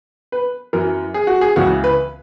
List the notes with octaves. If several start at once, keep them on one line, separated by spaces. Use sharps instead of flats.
B4
F#2 E3 A#4
G#4
F#4
G#4
C#2 C#3 E3 F#4
B4